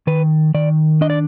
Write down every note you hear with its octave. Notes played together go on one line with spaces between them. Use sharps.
D#3 B4
D#3 D5
D4 D#5
D5